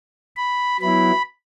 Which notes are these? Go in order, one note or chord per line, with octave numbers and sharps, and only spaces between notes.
B5
F#3 B3 E4 B5